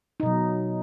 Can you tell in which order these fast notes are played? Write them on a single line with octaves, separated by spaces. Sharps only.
D#4 B2 F#3